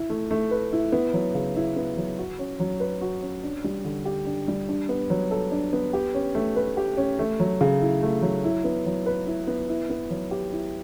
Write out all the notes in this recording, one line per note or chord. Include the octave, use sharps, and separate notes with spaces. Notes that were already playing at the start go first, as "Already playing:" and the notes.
Already playing: E4
A3
A3
B4
E4
B3
F#3
C#3
E4
B3
F#3
F#4
C#4
F#3
B4
F#4
C#4
D4
G3
D3
G4
D4
G3
D4
B3
F#3
A4
D4
B3
G4
C#4
A3
B4
G4
C#4
A3
F#3
C#3
E4
A3
F#3
E4
B3
F#3
B4
E4
B3
E4
B3
F#3
G4
E4